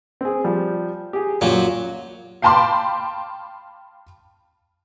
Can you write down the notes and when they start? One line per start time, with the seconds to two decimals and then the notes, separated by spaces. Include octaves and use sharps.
0.21 C4 G#4
0.44 F3 G3
1.13 G4 G#4
1.41 F#2 A#2 F#3
2.42 F5 G5 A5 B5 C6 D6